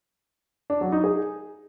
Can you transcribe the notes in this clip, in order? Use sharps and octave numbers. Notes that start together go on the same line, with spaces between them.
D4
F#3
D#4
G#4